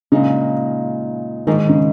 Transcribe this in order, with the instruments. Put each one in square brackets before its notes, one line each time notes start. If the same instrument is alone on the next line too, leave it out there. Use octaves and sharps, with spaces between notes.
[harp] A#2 G#3 D#4 [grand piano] C#3
[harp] G#2 G#3 D#4 [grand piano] D#3
[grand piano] C#3